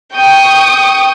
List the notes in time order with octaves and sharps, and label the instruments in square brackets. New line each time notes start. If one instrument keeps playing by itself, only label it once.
[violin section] G5 C#6 D#6